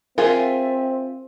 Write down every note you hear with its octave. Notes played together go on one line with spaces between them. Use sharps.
C4 F4 G#4 A#4 E5